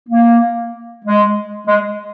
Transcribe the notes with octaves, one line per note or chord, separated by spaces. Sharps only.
A#3
G#3
G#3